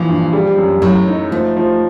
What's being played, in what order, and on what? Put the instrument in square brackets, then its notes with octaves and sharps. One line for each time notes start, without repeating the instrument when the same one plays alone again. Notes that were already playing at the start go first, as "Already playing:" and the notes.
Already playing: [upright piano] A#2 E3 [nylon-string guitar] F3
[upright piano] G2
G3
F#2
[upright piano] A2 [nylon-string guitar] F#3
[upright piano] D#4
[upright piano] F3 [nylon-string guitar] A3
[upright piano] F3